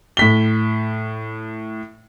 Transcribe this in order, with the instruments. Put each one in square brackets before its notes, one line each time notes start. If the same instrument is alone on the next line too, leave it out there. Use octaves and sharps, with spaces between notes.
[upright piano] A2 B6 G7